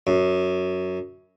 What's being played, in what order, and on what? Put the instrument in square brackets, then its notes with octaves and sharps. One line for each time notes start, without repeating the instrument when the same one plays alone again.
[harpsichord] F#2